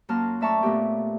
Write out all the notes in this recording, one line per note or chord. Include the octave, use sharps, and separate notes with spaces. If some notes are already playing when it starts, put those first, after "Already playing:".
F#2 F#3 A#3 A5 C6 F6
A3 D5 E5 A5 A#5 C#6
A#2 A3 B3 G4